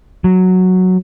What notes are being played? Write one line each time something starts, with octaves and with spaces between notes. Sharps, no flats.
F#3